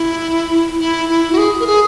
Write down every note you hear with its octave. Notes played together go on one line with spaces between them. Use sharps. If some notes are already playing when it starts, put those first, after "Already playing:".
Already playing: E4
E4
E4
F#4
G#4
A#4
G#4